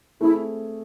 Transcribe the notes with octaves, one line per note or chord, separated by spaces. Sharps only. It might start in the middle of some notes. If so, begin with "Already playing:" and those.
A3 C4 E4 G#4